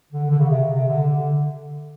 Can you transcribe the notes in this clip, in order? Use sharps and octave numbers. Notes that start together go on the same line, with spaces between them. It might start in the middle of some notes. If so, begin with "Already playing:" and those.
D3
D3
C#3
C3
C3
D3
D3